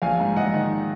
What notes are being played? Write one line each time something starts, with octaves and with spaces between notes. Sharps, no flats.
A#1 F5 G#5
G#2
A#1 D#5 F#5
D#3